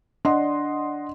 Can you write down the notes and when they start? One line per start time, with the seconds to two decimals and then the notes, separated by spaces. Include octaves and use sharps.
0.25 D4 D#5 F#5 C6